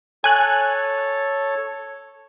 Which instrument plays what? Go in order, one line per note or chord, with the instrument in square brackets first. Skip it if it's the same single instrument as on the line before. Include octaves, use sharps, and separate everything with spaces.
[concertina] A4 C#5 [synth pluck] G#5 F#6